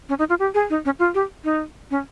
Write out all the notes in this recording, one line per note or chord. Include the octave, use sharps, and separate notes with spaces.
C#4
D#4
F4
G4
G#4
D#4
C#4
F4
G4
D#4
C#4